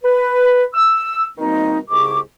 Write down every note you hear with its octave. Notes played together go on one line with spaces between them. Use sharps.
B4
E6
B2 D#3 G3 A#3 C4 D#4
C2 G#2 C#3 G#4 C#6 D6